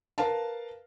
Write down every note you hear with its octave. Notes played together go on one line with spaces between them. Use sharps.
A#4 B4 F5 A5